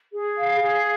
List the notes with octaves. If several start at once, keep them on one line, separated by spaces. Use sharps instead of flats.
G#4
F5
G#4